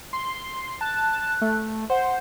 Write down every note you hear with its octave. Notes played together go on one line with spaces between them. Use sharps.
C6
A5 F#6
A3
C5 F#5